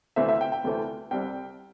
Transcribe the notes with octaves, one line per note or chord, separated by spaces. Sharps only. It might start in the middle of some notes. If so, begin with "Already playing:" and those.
D2 C3 E3 A3 C4 E5
E5
G5
G5
D2 C3 E3 A3 C4
C2 C3 G3 G5